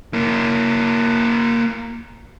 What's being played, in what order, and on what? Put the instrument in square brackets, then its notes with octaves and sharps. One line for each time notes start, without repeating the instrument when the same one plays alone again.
[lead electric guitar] A#3 E4